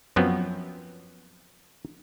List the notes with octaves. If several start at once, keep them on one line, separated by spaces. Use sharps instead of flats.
F#2 F3 F#3 B3 C4